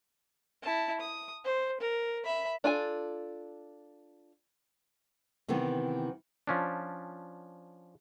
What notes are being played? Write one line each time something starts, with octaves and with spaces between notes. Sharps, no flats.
E4 A5
D#6
C5
A#4
E5 B5
D4 F4 A4 G#5
C3 D#3 E3 B3 C4
F3 C#4 D4